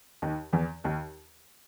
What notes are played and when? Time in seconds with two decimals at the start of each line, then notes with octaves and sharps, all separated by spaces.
0.22 D#2 D#3
0.52 E2 E3
0.84 D#2 D#3